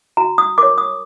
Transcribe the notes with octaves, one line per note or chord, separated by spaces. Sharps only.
F#4 A#5
D#6
A#4 C#5 D6
D#6